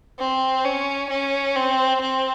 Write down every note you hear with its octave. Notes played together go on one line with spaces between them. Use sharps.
C4
C#4
C#4
C4
C4